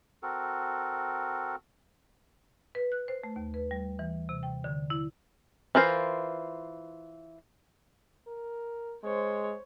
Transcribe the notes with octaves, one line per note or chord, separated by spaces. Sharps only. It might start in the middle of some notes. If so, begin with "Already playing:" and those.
C4 F#4 A4 A#4
B4
F#6
C5
A3
D#2
B4
G3
E3
C3
G5
D3
E4
E3 F4 A#4 C5
A#4
G#3 C5 C#5